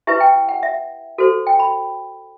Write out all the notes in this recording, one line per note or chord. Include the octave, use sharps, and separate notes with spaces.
E4 G4 B4 E5
G5
F#5
E5
F#4 A4 C5
G5
B5